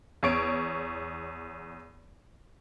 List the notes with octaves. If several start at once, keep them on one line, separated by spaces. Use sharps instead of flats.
E2 C#5 D7